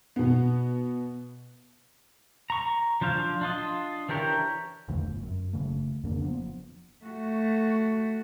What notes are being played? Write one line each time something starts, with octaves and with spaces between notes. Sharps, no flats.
B2 B3
A#5 C#6
F3 D4 C5 F5
D4 F4 D#5
E3 D4 G4 A#4 C#5
A#1 E2 D3 A3
G1
F#2
F#1 D2 C#3 A3
F2 C#3 A#3 D4
D1 A#1 F3 B3
A3 F#4